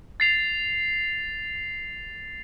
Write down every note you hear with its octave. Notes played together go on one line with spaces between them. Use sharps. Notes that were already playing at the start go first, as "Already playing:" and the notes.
A6 C7 F7